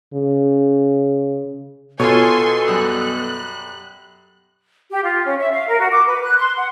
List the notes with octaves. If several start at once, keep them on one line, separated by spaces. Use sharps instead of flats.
C#3
B2 F4 A4 C#5 G#5 C6
F#2 G3 D#6 F#6
G4
F4
C#4
E5
F5
A#4
F#4
D6
B4
F#6
C6
F#5